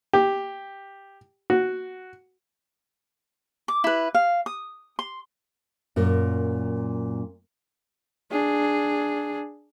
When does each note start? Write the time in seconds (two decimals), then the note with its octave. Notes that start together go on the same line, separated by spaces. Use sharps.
0.13 G4
1.50 F#4
3.68 D6
3.84 E4 B4
4.15 F5
4.46 D#6
4.99 C6
5.96 F#2 A#2 A#4
8.31 D4 G#4